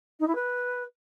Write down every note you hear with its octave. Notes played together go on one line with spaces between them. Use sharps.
D#4
E4
B4